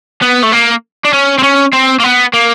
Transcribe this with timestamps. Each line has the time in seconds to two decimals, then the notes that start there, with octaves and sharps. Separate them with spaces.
0.22 B3
0.43 A3
0.53 A#3
1.05 D4
1.13 C#4
1.39 C4
1.44 C#4
1.73 C4
2.00 A#3
2.04 B3
2.34 A#3